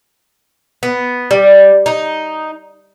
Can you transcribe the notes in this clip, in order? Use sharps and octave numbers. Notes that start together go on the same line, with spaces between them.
B3
G3
D#4